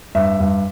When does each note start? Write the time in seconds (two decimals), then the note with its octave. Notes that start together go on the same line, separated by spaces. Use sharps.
0.15 G2 E5
0.40 G2